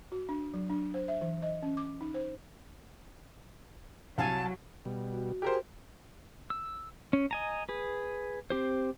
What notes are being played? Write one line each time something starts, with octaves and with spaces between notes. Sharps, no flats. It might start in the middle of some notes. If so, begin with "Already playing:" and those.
F#4
D4
F#3
D4
C5
E5
E3
D#5
C#4
D6
D#4
C5
C2 F#3 F5 G#5 A5
B2 G3
F#4
G4 G#4 A#4 C5
E6
C#4
D#5 G#5 A#5
G#4 B4
C4 G4 C5